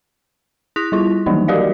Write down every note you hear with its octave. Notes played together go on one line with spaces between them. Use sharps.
E4 D#6 F#6 A#6 B6 F7
G3 E4 F4
D#3 E3 F#3 G3 A#3 D#4
F#4 G4 A#4 D5 D#5 F5